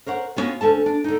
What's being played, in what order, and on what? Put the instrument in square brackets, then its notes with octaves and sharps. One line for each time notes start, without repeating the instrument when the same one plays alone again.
[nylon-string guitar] A#4 C5 C#5 F#5
G3 B3 C#4 D4 F4 F#4
D2 C#4 A4 A5
D4
D3 D#4